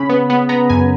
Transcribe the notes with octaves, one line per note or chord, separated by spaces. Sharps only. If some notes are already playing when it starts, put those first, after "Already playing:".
Already playing: C#3 B5
B3
B3
B3 A#5
F#2 G#5